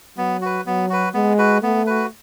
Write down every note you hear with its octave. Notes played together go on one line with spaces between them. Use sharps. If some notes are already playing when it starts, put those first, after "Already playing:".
F#3 B3
F#4 B4
F#3 B3
F#4 B4
G#3 B3
F#4 B4
A3 B3
F#4 B4